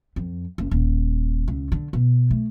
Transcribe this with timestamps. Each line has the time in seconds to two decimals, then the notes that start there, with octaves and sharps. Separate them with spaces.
0.16 F2
0.58 F#1
0.71 D#1
1.48 C#2
1.72 D3
1.93 B2
2.31 A3